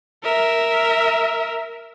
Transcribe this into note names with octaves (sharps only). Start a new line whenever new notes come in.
A#4 E5